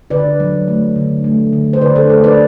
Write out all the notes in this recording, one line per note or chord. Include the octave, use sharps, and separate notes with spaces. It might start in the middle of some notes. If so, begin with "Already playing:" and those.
D3 B4 D5
F#3
A3
D3
A3
D3
C5
D3 B4 D5
A4 C5
A3 A4 C5
B4 D5